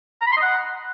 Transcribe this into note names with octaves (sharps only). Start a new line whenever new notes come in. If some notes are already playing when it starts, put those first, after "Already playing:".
A#5
B5
C6
D#5
F#5